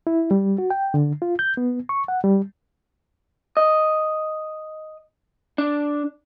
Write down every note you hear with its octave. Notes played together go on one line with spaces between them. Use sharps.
E4
G3
F#4
G5
D3
F4
G6
B3
C#6
F#5
G3
D#5
D4